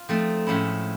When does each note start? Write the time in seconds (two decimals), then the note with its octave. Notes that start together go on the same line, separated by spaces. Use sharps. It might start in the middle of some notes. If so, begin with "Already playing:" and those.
Already playing: F4
0.09 F3 A3 C4 D#4
0.47 A2 F3 G#3 C#4 E4